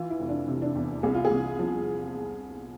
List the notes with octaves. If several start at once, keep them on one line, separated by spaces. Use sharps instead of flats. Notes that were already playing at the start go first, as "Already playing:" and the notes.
Already playing: E3 F4
E4
F1
D4
C3
D4
E2
C2 G#4
F4
G#4
C2
F3